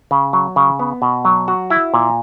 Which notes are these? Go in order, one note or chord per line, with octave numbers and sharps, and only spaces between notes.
C#3
F#3
C#3
B3
B2
F#3
F#4
E4
A#2